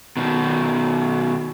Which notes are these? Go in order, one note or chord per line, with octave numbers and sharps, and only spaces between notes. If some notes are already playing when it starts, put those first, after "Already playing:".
B2 D#3